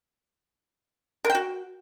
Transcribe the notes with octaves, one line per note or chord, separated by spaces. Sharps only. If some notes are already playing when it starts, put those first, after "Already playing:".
A#4
G5
F#4